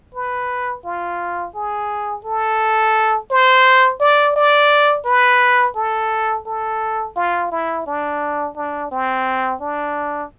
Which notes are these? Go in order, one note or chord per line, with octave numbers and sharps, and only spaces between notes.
B4
F4
G#4
A4
C5
D5
D5
B4
A4
A4
F4
E4
D4
D4
C4
D4